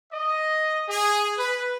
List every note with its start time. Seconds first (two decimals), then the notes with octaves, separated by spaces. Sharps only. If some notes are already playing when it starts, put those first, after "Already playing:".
0.13 D#5
0.89 G#4
1.37 B4